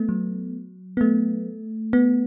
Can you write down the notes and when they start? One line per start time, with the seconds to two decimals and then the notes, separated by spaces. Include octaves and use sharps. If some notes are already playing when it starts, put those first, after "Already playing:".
Already playing: A3 B3
0.09 F#3
0.97 B3
1.01 A3
1.93 B3